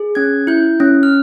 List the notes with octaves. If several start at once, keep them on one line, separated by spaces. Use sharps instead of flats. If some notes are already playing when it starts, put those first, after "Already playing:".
Already playing: G#4
C#4 G#6
E4 G6
C#4
F6